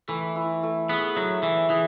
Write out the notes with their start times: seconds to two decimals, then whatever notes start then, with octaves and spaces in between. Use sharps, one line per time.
0.08 E3 A3
0.36 E4
0.63 A3
0.89 B3 G#4
1.16 F#3 E5
1.43 E3 E5
1.70 E3 G#4